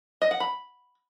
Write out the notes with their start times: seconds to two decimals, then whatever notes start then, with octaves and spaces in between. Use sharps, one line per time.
0.22 D#5
0.31 F#5
0.40 B5